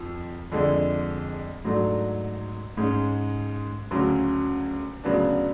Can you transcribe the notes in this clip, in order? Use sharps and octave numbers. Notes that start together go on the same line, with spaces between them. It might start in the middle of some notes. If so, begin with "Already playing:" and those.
Already playing: F2 F3
F2 D3 G#3 D4
G#2 F#3 A3 D4
G#2 G#3 C#4
D2 C#3 F#3 C#4
D2 C#3 F#3 B3 D4